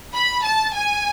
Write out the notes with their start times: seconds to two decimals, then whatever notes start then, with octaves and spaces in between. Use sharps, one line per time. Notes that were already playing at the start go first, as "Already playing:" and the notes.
0.14 B5
0.45 A5
0.75 G#5